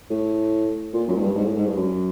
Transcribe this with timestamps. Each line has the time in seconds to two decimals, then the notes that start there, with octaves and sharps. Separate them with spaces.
0.10 A2
0.93 A#2
1.08 F#2
1.16 G#2
1.20 G2
1.35 G#2
1.45 A2
1.56 G#2
1.67 G2
1.76 F#2